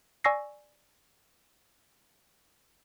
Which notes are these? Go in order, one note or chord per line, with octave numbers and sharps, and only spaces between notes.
D5 G#5 C#6 E6 A#6 C7